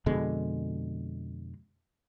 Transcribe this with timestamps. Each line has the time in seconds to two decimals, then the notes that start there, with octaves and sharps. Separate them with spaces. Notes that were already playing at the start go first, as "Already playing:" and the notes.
0.06 F2 B2 D3 G#3